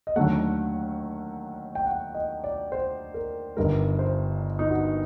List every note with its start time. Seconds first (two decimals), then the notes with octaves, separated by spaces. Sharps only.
0.07 D#5
0.16 D#2 D3 F#3 A3 F#5
1.75 G5
1.86 F#5
2.14 D#5
2.44 D5
2.72 C5
3.14 A#4
3.57 G1 G2 D#3 G3 A#4
3.99 C5
4.59 D#4
4.70 F#4